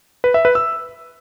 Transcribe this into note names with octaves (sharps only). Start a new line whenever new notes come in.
B4
E5
B4
E6